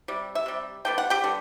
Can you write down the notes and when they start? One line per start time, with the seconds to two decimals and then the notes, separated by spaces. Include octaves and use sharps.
0.08 C3 G3
0.35 E5
0.46 C3 G3
0.85 D3 G3 B3 G5
0.98 F#5
1.10 G4 G5
1.24 D3 G3 B3